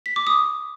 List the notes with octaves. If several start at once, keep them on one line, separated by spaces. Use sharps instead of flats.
B6
D6
D#6